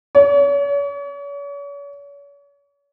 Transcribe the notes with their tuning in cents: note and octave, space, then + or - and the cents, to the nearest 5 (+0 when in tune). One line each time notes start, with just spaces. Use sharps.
C#5 +40